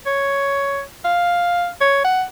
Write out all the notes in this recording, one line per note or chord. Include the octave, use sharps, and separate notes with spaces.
C#5
F5
C#5
F#5